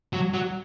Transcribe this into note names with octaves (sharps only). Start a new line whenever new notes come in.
F#3
F#3